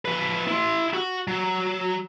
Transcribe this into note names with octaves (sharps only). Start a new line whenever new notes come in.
F3 B4
E4 C6
F#4 F#5
F#3